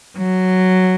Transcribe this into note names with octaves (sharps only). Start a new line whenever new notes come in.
F#3